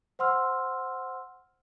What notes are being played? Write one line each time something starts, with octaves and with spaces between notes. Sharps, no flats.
C5 F#5 C6 E6 F6